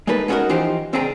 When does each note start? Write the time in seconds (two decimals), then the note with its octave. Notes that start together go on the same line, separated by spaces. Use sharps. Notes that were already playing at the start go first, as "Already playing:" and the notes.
0.07 G#3 A#3 D#4 A4 B4
0.28 G#3 B3 C#4 D#4 F#4 A#4
0.49 E3 F3 D#4 G4 C5
0.93 C#2 C4 D4 G#4 G5 A#5